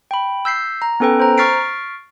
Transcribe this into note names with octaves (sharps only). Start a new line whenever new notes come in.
G5 B5
E6 G6 B6 C7
A#5
B3 C#4 A4 B4 G5
C5 A#5
C#6 F6 A6 B6 C7 D7